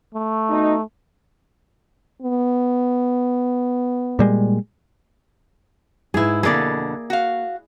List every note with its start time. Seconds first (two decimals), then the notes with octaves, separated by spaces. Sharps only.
0.15 A3
0.49 B2 D#4
2.22 B3
4.19 A#2 G3 G#3
6.14 G#2 E4 G#4 B4
6.43 F2 B2 D3 A#3 G#4 D5
7.10 F#4 F5